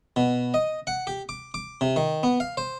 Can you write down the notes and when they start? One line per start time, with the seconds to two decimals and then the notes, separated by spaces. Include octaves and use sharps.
0.16 B2
0.54 D#5
0.87 F#5
1.07 G4
1.29 D6
1.54 D6
1.81 C3
1.96 D#3
2.23 B3
2.40 F5
2.57 C5